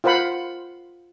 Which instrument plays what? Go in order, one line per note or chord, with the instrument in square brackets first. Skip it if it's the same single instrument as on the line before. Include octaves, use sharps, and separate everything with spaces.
[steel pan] F4 A#4 C5 F#5 B5